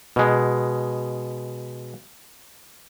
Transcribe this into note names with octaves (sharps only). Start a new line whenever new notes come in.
B2 G#3